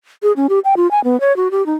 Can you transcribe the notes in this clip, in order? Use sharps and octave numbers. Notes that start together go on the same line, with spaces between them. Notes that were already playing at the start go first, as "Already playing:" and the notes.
G#4
C#4
G4
G5
F4
G#5
B3
C#5
F#4
G4
D#4